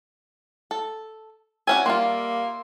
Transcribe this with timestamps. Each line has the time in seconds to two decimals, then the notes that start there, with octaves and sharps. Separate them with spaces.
0.71 A4
1.67 C4 C#4 F#4 D5 E5 G#5
1.86 G3 A#3 F4 C6